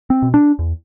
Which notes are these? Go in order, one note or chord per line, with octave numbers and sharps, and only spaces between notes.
C4
B2
D4
E2